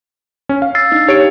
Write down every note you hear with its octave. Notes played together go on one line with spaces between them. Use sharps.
C#4
F5
E6 A6 C7
D4 D#4
G4 C#5 D7